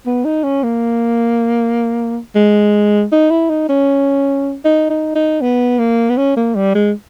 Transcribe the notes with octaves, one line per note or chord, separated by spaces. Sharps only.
B3
D#4
C#4
A#3
G#3
D#4
E4
D#4
C#4
D#4
D#4
D#4
B3
A#3
B3
C#4
A#3
G3
G#3